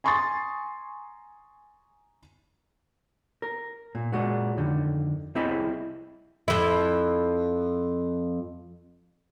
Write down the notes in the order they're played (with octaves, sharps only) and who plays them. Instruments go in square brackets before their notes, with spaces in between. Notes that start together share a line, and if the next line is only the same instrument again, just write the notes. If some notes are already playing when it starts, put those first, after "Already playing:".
[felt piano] G#5 A#5 C6 C#6 D#6 A6
[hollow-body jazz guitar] A#4
A#2
A#2 G#3 F#4
F2 D3 D#3
C2 C4 E4 G#4 D#5 B5
[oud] F2 E4